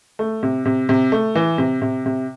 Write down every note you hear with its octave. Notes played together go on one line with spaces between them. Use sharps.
A3
C3
C3
C3
A3
E3
C3
C3
C3